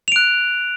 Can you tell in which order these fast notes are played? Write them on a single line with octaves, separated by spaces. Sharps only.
F7 D7 F#6